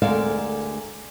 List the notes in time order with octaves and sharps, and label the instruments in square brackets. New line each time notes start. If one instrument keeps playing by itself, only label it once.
[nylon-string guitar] D2 G#3 A4 A#4 D5 F5